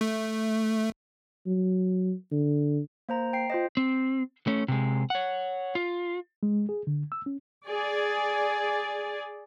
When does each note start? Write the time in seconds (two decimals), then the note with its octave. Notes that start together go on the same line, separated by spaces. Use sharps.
0.01 A3
1.47 F#3
2.32 D3
3.09 A#3 C5 A#5
3.33 G5 C7
3.50 F4 C5 D#5
3.77 C4
4.47 A3 C#4
4.68 C3 G#3
5.10 C#5 F#5
5.75 F4
6.43 G#3
6.69 G#4
6.87 D3
7.12 E6
7.26 C#4
7.65 G#4 D5